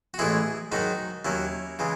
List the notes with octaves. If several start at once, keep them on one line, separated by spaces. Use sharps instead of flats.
F#4
A1 A2 E3 G#3 E4 G#4
G#2 D#3 F#3 D#4 F#4
D#2 D#3 F#3 C#4 E4
C#3 E3 G#3